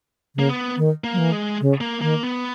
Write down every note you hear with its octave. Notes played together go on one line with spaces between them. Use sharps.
C#3 A#3
B3
D#3
A#3
F#3
E3
G#3
C#3
A#3
D#3 A#3
B3